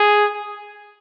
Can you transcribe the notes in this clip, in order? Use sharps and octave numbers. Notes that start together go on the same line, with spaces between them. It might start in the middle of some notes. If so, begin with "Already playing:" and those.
Already playing: G#4